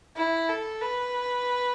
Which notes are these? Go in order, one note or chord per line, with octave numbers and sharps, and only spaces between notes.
E4
A4
B4